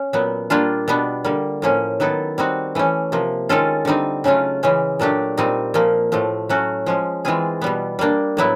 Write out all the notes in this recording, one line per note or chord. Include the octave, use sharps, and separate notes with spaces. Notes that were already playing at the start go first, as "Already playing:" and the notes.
Already playing: C#4
A#2 F#3 B3
G3 A#3 D4 F4
B2 G3 B3 D4
D3 G3 A#3
A2 F3 A#3 C#4
D#3 F#3 B3 E4 A4
G3 C4 D#4 F#4
E3 A3 C#4
C3 F3 A#3
D#3 G#3 C#4 F4 A4
D3 G3 C4 D#4
C#3 F#3 A3 C#4 F4
C#3 E3 G#3 C#4
A#2 F#3 A3 D4 G4
A#2 G3 C4 D#4
A#2 F3 A#3
A2 F3 A3
F#3 A3 C#4 F#4
F3 G#3 C#4
E3 G#3 C4 F4 G#4
B2 G3 B3
G3 A#3 D4
A2 F#3 B3 E4